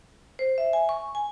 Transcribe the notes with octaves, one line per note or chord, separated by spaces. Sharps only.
C5
E5
G#5
C#6
G#5